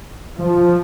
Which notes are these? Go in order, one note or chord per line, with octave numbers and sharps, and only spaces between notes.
F3